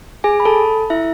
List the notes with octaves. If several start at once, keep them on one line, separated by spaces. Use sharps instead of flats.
G#4 G#5
B5
A4 A5
E4 E5